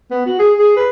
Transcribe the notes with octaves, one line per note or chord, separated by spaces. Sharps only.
B3
F#4
G#4
G#4
B4